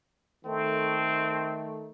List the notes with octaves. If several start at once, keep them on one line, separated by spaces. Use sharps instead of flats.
D#3 A3 C4